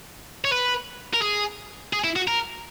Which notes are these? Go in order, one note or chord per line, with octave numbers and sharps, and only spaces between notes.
C#5
B4
A#4
G#4
G#4
E4
F#4
A#4